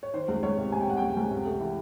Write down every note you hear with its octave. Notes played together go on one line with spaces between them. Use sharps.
C#5
D#3 C5
C#2
C#2 C#5
C3
C3 G#5
G5
C3 F#5
C#2 G5
C#2
C3
A3
E3